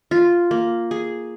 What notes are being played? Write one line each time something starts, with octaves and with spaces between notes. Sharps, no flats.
F4
A#3
G#4